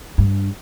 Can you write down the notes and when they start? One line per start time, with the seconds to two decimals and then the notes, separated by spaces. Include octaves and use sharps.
0.18 G2